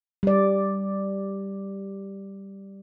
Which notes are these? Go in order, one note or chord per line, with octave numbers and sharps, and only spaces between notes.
G3 D5